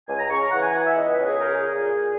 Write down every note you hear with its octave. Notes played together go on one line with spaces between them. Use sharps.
C#2 G#5
A#5
C#3 C#6
A#5
E3 F#5
G#5
B3 F#5
E5
C#2 D#5
B4
C#3
G#4
D#4 A#4
G#4
A#2
A#2